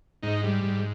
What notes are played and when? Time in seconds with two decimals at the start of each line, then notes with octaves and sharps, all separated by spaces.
0.23 G#2 D#4
0.43 G3
0.64 G#2